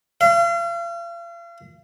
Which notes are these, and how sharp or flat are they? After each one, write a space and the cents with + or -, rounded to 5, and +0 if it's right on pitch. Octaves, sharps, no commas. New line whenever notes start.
F5 -40